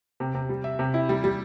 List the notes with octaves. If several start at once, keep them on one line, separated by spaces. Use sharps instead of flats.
C3
C3
G3
E5
C3
E4
G3
G3